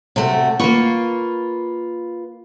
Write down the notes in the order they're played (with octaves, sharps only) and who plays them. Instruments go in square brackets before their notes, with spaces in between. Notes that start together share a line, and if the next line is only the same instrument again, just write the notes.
[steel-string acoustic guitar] C3 A3 F#4
[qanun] A#3 C#6 [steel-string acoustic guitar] F4 B4